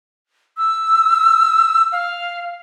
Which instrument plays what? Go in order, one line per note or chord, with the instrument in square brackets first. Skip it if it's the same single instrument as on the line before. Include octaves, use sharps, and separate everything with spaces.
[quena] E6
F5